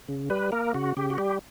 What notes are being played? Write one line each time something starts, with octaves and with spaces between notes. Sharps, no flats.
C#3
G3 B4
A#3 A#4
C#3 F#4
C#3 G4
F#4
G3 G4